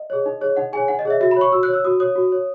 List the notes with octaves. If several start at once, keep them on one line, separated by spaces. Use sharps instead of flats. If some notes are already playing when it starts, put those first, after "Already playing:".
Already playing: D#5
G#4 C#5
D#4
G#4 C#5
D#4 F#5
G#4 C#5 G#5
D#4 F#5
D#5
G#4 C#5 E5
F#4 E5
B5
C#5 C#6
F#4 E6
F#6
C#5
E6
F#4 D#6
C#5 D#6
F#4
C#5